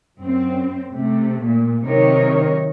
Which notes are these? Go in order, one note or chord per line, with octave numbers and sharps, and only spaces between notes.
F#2 C4
C3 A3
A#2
C3 D#3 F#3 D#4 A#4 C#5